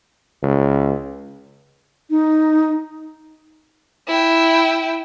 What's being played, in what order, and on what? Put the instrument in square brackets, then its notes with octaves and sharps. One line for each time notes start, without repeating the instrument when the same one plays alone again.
[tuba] C#2
[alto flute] D#4
[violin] E4 G5